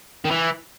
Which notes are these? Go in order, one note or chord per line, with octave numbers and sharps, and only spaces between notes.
D#3
E3